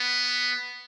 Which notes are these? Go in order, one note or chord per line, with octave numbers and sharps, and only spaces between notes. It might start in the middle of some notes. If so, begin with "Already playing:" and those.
Already playing: B3